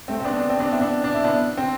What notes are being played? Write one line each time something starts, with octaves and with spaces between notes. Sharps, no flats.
A3 C4
C4
B3 D4
D4
C4
B3 D4
C4 E4
B3 D4
D4
E4
B3 D4
C4